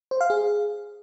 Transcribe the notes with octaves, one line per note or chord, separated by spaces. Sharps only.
C5
F5
G#4